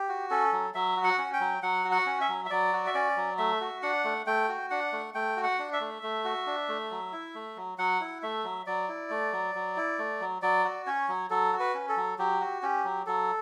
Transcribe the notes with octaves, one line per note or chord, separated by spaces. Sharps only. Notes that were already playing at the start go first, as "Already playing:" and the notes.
Already playing: G4
F#4
C#4 A4
F#3
F#3 E5
F#4
F#5
C#4
G5
F#3
F#3 F#5
F#4
F#5
C#4
E5
F#3
E5
F#3 D5
F#4
E5
C#4 D5
F#3
A3 E5
F#4
D4 F#5
A3
A3 G5
F#4
D4 F#5
A3
A3 G5
F#4
F#5
D4
E5
A3
A3
F#4
D4
A3
F#3
E4
A3
F#3
F#3 F#5
E4
A3 E5
F#3
F#3 D5
E4
A3
F#3
F#3
E4
A3
F#3
F#3 D5
F#4
C#4 C#5
F#3
F#3 A4
F#4
B4
C#4
A4
F#3
F#3 G4
F#4
C#4 G4
F#3
F#3 A4